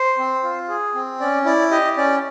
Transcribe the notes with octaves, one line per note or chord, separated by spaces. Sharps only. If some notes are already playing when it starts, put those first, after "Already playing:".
Already playing: C5
C4
F4
G#4
C4
C#4 D5
E4 D5
G4 D#5
C#4 D5